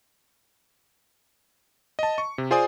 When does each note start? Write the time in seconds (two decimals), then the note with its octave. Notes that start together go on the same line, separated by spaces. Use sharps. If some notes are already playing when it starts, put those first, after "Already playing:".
1.99 D#5 A5
2.18 C#6
2.38 C3
2.51 F4 G#4 C5 D5 G#5 D#6